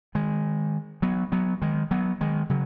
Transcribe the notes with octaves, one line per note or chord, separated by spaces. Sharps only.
D#3 G#3
F#3 B3
F#3 B3
D#3 G#3
F#3 B3
D#3 G#3
C#3 F#3